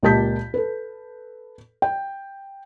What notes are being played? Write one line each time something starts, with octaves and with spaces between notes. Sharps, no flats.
C#2 A#2 G4 A5 G6 B6
A4 B4
G5